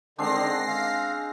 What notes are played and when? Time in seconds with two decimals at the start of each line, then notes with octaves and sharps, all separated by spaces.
0.18 D3 D#3 G#3 C4 D4 A#6 C7
0.68 F5